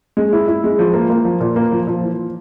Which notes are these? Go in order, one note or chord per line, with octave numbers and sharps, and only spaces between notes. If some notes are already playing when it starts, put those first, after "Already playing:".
G#3
E4
E4
G#3
F3
A#3
A#3
F3
A#2
A#3
F3
F3
E3